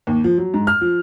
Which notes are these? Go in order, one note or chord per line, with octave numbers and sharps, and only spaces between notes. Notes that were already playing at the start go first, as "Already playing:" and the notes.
D#2
F3
F#3
G#2
F6
F3